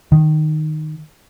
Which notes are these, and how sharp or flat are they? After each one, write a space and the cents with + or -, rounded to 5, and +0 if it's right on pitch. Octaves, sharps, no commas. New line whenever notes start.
D#3 -10